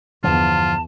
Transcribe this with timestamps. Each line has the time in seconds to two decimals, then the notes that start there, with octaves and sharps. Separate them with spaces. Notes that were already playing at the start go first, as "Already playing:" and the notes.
0.24 E2 G2 D3 F3 F4 A5